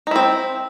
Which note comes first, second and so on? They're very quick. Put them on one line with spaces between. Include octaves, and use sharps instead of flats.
D#4 E4 C4